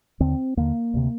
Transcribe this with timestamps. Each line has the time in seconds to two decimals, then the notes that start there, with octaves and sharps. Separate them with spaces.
0.20 D#2 D3 C4
0.57 D#2 D3 A#3
0.94 D2 C3